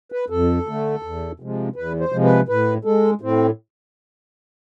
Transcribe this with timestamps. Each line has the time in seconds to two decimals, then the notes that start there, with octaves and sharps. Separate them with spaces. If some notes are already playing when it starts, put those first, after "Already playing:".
0.12 B4
0.30 F2 A4
0.66 D3 A3
1.02 E2
1.40 C3 F3 G#3
1.76 E2 B4
2.00 C5
2.12 C3 F3 G#3
2.24 B4
2.49 A2 B4
2.85 G#3 A4
3.21 A2 C4